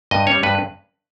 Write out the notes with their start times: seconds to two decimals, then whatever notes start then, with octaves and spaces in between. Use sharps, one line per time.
0.11 G2 D#5
0.27 G3 C#4 C#5
0.43 G2 B4